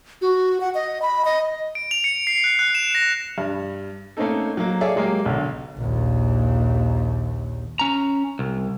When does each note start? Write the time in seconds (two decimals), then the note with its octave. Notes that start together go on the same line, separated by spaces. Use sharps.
0.22 F#4
0.61 F#5
0.75 D#5
1.02 B5
1.25 D#5
1.75 D7
1.91 F7
2.04 C#7
2.27 C7
2.44 F#6
2.59 F#6
2.75 E7
2.95 A#6
3.38 G2
4.17 A3 A#3 C4 C#4 D#4 A4
4.57 F#3 A#3
4.81 G#4 A4 C#5 D5 E5 F5
4.96 F#3 G#3 A#3 G4 A#4
5.26 B1 D3
5.78 A#1 D#2
7.79 C#4 A#5
8.39 C2